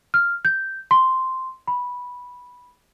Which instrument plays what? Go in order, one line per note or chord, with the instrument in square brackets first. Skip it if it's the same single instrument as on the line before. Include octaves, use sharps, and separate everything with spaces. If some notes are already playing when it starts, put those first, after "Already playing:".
[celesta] F6
G6
C6
B5